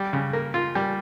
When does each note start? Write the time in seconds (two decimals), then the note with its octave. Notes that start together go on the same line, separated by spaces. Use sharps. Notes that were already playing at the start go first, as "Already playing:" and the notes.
Already playing: G3
0.13 C#3
0.33 A#3
0.54 F4
0.75 G3